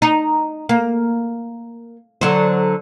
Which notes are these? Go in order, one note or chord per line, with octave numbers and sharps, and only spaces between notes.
D#4
A#3
D3 F#3 C5